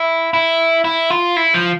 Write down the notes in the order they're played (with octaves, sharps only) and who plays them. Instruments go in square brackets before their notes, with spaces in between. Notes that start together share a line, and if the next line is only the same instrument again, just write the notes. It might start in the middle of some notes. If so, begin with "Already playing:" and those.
Already playing: [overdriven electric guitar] E4
E4
E4
F4
E4
F3